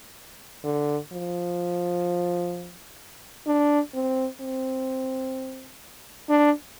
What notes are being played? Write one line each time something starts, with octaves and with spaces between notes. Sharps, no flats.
D3
F3
D4
C4
C4
D4